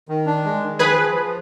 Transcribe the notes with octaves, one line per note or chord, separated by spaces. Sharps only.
D#3
D4
G#3
D#3
F3 G#4 B4
F3
F3